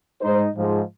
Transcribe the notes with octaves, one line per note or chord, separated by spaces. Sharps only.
G#2 G#3 D#4 C5
G#2 F3 G#3